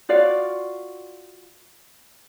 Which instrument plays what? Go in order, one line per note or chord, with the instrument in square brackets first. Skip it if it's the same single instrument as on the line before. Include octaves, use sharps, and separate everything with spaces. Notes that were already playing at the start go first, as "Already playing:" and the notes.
[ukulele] F4 F#4 D5 F5